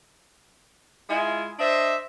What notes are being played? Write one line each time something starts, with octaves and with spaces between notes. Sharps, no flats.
G#3 E4 F4 G#5
D4 C5 D#5 E5